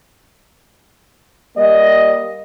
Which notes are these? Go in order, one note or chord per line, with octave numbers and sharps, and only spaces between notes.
G3 A#3 D#5